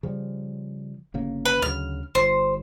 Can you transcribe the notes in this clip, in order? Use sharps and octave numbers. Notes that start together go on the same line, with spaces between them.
C#3 F3 G3
G1 C#3 A#3
B4
D2 C#3 F#3 F6
G1 C5